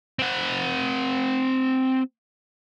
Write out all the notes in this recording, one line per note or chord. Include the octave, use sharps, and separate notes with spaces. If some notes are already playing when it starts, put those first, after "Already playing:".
C4 F#5